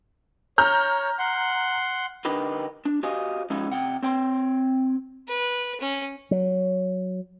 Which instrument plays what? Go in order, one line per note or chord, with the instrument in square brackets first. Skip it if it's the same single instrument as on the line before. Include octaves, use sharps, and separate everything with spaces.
[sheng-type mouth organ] C#5 [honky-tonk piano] A#5 F6 G6
[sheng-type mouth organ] F#5 C6
[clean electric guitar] D3 D4 D#4 G4 A#4 B4
D4
F#4 G4 C5 D#5 F5 G#5
F3 G#3 C#4 D#4 E4
C3 F#5 G5
C4 C#5 G5 B5 C6
[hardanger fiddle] B4
C#4
[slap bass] F#3